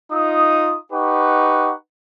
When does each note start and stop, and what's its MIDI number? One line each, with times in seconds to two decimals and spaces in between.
0.12 0.76 63
0.12 0.76 65
0.12 0.76 87
0.93 1.73 63
0.93 1.73 67
0.93 1.73 71
0.93 1.73 78
0.93 1.73 85